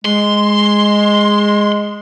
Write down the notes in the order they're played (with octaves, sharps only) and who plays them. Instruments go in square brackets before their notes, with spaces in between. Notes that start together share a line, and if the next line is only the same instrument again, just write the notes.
[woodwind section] G#3 [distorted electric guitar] C6